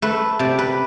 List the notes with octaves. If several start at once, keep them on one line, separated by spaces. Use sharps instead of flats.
A3 B4
C3 D5
B4